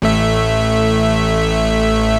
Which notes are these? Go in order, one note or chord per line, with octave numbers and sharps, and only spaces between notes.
A1 A3 E5